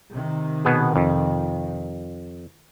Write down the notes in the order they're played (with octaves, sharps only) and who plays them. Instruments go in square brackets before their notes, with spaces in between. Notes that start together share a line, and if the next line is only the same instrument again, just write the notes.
[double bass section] C3 D#3
[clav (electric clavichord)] B2 B3 G#4
F2